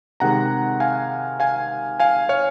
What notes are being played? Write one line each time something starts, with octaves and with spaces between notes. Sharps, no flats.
C3 D#3 G#3 F#5 A#5
F5 G#5
F5 G#5
F5 G#5
C#5 F5